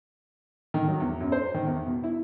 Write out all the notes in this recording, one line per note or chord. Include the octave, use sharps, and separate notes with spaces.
D#3
F#3
E2
F#2
C5
D#3
E2
B2
E4